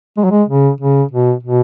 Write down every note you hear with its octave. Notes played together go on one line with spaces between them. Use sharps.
G#3
F#3
G#3
C#3
C#3
B2
B2